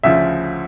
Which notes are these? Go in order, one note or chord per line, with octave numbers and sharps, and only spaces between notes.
D2 C#3 F3 E5